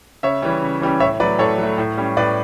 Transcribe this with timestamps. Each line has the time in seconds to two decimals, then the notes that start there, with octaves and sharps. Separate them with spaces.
0.23 C#3 C#5 E5
0.42 E3 G3 C#4
0.63 C#3
0.81 E3 G3 C#4
1.00 A2 C#5 E5
1.20 F#3 A3 B4 D5
1.39 A2 A4 C#5
1.58 F#3 A3
1.78 A2
1.97 G3 C#4
2.17 A2 B4 D5